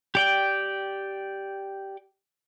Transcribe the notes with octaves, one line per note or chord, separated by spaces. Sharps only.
G4 D5 G5